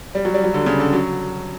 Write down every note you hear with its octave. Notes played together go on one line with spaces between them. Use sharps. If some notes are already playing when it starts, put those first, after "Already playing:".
G3
F#3
G3
F#3
D3
C#3
D3
F#3